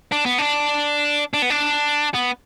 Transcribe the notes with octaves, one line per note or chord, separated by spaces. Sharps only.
D4
B3
D4
D4
B3
D4
B3